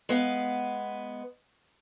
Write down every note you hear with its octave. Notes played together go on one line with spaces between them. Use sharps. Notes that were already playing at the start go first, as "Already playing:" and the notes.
G#3 B3 F5